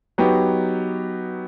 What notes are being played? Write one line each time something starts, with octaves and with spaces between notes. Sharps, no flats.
F#3 B3 D#4 G4